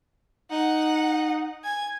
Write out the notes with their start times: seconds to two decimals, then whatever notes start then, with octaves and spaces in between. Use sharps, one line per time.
0.51 D#4 F#5
1.64 G#5 G#6